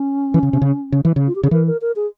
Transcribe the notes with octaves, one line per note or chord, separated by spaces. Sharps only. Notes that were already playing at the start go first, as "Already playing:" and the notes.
Already playing: C#4
E3
C#3
C3
C#3
C#3
E3
C#3
F4
G4
C#3 G#4
E3 A#4
A#4
A#4
G#4